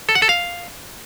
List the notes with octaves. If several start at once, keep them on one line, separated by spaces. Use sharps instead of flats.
A4
F#5
A4
F5